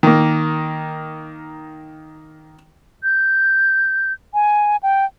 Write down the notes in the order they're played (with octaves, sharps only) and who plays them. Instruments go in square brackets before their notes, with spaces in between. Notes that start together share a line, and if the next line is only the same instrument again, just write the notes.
[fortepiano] D#3 A#3
[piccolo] G6
G#5
G5